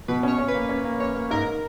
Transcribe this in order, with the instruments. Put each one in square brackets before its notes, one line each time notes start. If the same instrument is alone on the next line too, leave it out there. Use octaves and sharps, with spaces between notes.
[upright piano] B2 [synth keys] B4
[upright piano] C#4 [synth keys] C#5
[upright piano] C#4
[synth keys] B4
[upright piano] A#3
C#4
A#3
[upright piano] C#4 [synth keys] C#5
[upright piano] A#3
[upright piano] G#2 [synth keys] A#4